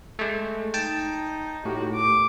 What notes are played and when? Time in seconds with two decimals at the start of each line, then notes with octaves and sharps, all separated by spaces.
0.19 G#3 A3
0.74 D#4 G5 A5
1.65 A2 F#4 G4
1.94 D6